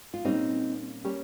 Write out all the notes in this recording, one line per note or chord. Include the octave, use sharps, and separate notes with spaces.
F4
A#2 G3 A#3 C4 C#4 D#4
G3 A#3 C#4 G4 C#5